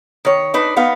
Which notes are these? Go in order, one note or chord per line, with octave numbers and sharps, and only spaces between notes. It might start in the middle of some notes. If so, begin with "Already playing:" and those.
D#3 C#5
D4 D#4 B4
B3 D#4 F5